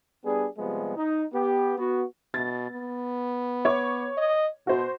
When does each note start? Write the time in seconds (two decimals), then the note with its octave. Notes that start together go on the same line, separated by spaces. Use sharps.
0.25 G3 B3 D4 G#4
0.58 C3 F3 G3 G#3 B3
0.96 D#4
1.33 B3 G4
1.78 B3 F#4
2.34 B2 A6
2.70 B3
3.65 C#5 D6
4.17 D#5
4.67 B2 F#4 C5